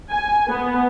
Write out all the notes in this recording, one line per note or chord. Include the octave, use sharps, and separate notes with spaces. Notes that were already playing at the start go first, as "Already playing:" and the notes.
G#5
B3